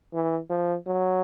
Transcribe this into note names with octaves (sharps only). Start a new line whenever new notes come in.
E3
F3
F#3